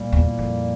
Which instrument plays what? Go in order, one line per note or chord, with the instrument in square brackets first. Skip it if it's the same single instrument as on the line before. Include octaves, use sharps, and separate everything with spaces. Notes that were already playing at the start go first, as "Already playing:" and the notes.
Already playing: [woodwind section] C2 A#2 G3 A#3
[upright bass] E2
F2